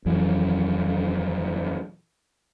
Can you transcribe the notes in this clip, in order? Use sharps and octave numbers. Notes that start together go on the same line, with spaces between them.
D#1 F2 E3 F#3